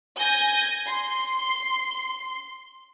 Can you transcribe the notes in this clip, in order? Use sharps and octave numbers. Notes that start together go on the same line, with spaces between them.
G#5 G6 A#6
C6